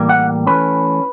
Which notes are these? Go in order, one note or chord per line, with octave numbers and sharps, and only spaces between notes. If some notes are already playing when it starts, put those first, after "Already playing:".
Already playing: A2 E3 G3 A#3
F#5
E3 A3 C#4 B4